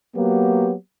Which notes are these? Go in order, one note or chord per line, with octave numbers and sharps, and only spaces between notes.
F#3 A#3 B3 F#4 G4